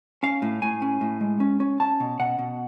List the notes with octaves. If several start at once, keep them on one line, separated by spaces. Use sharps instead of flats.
C#4 F5
A2
A2 G#5
C#4
A2
G#3
C#4
C#4
C#4 A5
B2
B2 F#5
B2